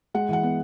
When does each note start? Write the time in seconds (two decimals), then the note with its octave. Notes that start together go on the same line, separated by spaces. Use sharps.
0.14 G#3 F#5
0.29 E3 F#5
0.43 B3